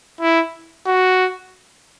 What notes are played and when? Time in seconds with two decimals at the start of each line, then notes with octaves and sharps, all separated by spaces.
0.21 E4
0.86 F#4